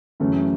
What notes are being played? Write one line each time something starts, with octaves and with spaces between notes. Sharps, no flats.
F#2 C#3 E3 A3 C#4